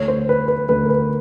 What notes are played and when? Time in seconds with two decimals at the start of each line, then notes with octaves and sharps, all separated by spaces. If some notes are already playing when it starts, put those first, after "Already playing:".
Already playing: D2 D3 C#5
0.08 C5
0.29 B4
0.48 B4
0.69 D2 D3 B4
0.83 A#4
0.89 B4